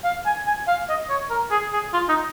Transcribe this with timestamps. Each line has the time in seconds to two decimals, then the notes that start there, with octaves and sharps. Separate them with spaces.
0.04 F5
0.26 G#5
0.47 G#5
0.67 F5
0.89 D#5
1.09 C#5
1.30 A#4
1.51 G#4
1.73 G#4
1.93 F4
2.09 D#4